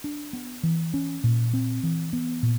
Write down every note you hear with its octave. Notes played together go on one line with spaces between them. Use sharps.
D4
B3
E3
C#4
A#2
C4
E3
B3
A#2